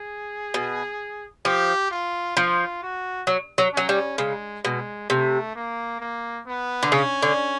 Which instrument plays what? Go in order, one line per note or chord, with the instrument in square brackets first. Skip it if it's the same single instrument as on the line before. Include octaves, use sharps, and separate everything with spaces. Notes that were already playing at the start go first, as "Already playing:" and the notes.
Already playing: [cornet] G#4
[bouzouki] B2
[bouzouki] F3 [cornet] G4
[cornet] F4
[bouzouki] F3 [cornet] F4
[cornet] F#4
[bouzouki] F#3
F#3
[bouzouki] F#3 [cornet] C#4
[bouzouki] G3
[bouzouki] C#3 [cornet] G#3
[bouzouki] B2 [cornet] G#3
[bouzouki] C3 [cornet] A3
[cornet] A#3
A#3
B3
[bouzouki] D3
[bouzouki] C#3 [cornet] C#4
[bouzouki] D3